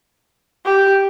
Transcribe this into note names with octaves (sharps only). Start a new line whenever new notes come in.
G4